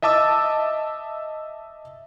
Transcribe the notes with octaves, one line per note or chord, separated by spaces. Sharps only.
D#5 E5 A5 D6 E6